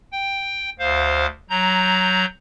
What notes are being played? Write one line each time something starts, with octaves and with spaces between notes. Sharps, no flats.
G5
D2 C5 F5
F#3 A#5 G6